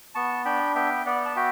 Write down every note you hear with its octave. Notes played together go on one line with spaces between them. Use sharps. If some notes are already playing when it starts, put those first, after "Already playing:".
B3 A5 C#6
D4 G5 B5
B3 E5 G5
B3 D5 F#5
A5
F#4 E5 G5